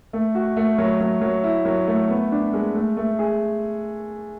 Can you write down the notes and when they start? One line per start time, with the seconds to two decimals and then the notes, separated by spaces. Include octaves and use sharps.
0.13 A3
0.35 F#4
0.57 A3
0.78 F#3
1.01 F#3
1.21 F#3
1.44 E4
1.65 F#3
1.87 A3
2.09 B3
2.32 D4
2.53 G#3
2.75 A3
2.97 A3
3.19 G#4